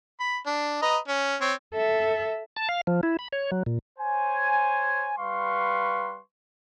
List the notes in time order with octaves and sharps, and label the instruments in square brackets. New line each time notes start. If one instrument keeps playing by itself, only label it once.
[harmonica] B5
D4
B4 D#5 A#5
C#4
C4 C#5
[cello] A4 E5
[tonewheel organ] A5
F5
F3
E4
B5
C#5
F#3
A#2
[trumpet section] C5 C#5 G#5
G3 B4 F5 C6 C#6